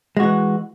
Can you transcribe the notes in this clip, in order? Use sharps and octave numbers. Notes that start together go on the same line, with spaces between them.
E3 G#3 F#4